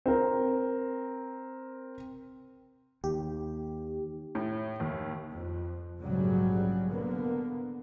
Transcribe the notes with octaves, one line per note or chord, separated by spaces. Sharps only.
C4 A#4
D#2 G4
A2
D#2
F2
A#1 G#2 C#3 F#3 G3
D3 A#3 B3